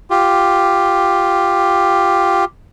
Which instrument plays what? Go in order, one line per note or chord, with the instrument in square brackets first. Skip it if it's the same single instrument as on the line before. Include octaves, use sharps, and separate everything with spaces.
[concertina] F4 G4